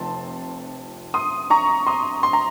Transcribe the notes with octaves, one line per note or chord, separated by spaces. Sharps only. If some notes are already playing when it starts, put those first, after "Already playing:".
Already playing: F1 F2 C3 F3 A5 C6
C6 D#6
A#5 C#6
C6 D#6
C6
A#5